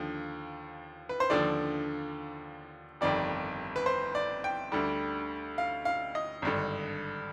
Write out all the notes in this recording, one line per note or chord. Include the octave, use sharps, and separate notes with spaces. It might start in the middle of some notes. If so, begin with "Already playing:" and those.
Already playing: D#2 D3 F3
B4
C5
D#2 D3 F3 D5
G1 F2 D#3 G3 D5
B4
C5
D5
G5
D2 D3 G3
F5
F5
D#5
G#1 G2 D3